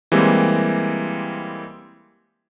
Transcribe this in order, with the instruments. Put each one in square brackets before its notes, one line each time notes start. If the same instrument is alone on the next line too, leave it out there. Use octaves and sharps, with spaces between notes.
[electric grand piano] E3 G3 G#3 A#3 C4 G4